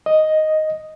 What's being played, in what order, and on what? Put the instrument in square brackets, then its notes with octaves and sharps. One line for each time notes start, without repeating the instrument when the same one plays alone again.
[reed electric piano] D#5